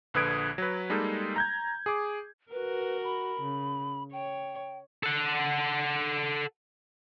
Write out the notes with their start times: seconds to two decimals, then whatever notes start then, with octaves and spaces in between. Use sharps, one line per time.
0.14 A#1 D3 B4 D#6 G#6 D7
0.58 F#3 B4
0.90 G3 G#3 A#3 D#4 A4
1.36 A#5 G6 G#6
1.86 G#4 D6
2.52 F#4 A#4 B4
3.03 B5
3.41 C#3
4.13 C#5 G5
5.03 A4 F#5